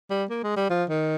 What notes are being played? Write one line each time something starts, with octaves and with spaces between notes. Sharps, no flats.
G3
A#3
G#3
G3
F3
D#3